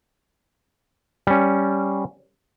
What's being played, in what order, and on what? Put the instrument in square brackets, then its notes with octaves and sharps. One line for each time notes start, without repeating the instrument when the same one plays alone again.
[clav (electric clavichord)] G3 C#4